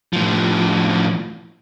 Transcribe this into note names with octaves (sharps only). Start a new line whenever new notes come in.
A2 F3